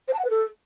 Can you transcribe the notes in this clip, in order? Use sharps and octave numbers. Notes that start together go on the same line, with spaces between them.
C5
A5
F#5
B4
A4